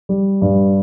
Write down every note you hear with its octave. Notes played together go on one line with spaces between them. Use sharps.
G3
G2